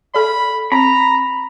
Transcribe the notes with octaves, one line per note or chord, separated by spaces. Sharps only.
A4 D5 B5
C4 A#5 B5